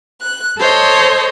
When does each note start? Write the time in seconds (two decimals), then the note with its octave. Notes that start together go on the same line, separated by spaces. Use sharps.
0.21 F#6
0.57 A4 C5 C#5 D#5